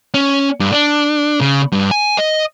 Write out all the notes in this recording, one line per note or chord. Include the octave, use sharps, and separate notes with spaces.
C#4
G2
D4
C#3
G2
G#5
D#5